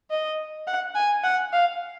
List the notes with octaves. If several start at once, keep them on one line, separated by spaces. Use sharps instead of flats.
D#5
F#5
G#5
F#5
F5